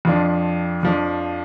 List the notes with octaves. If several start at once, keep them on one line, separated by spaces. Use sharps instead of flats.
F2 F3 D4
F2 F3 D4